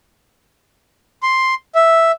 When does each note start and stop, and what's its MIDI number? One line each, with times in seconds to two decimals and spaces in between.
1.23 1.54 84
1.75 2.12 76